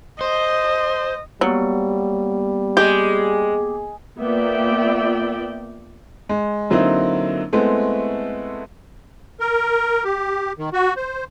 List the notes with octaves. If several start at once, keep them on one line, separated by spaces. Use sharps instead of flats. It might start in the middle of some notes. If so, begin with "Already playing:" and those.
C5 D#5
F#3 G3 A#3 B3
G#3 G4
A#3 B3 F4 D5 E5 G5
G#3
D3 F#3 A#3 C4 D#4 E4
G#3 A3 B3 C4 E4
A#4
G4
D#3
F#4
C5